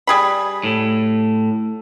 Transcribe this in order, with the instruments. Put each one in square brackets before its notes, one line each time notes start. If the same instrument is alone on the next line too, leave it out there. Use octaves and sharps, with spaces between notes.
[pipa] G3 G#4 B5
[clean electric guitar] A2